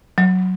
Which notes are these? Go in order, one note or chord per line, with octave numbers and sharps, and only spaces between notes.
F#3